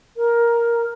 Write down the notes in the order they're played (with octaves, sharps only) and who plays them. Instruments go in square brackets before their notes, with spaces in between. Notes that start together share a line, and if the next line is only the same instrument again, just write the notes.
[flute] A#4